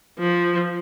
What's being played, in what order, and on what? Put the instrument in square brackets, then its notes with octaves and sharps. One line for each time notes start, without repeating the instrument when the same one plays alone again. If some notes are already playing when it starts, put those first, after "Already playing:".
[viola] F3